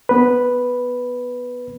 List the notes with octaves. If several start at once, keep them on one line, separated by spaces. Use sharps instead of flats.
B3 B4